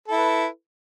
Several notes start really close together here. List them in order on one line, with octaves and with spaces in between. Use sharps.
A4 E4 B4